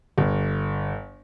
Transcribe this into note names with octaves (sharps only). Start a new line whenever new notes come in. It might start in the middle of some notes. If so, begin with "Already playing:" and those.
G1